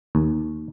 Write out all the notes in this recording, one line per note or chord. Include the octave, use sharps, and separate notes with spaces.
D#2